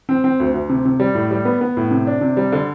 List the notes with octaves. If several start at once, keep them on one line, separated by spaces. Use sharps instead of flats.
C4
C4
D2
D2
C3
C3
G3
A2
G3
B3
B3
A2
C3
D4
C3
G3
D3